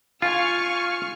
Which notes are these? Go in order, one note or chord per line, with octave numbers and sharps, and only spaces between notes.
F4 F5 G#5 C#6 F6